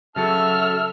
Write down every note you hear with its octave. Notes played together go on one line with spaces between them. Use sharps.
C#3 F#3 A4 E5 A5 F6 C#7